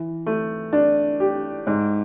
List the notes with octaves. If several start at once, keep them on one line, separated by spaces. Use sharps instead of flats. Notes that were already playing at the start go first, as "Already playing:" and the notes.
Already playing: E3
A3
D4
G4
G#2